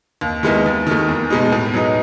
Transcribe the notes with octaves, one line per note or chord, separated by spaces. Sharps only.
D#2
D#3 G#3 B3 E4
D#2
D#3 A3
E2
B2 G#3 D#4
A2
F#3 B3 D#4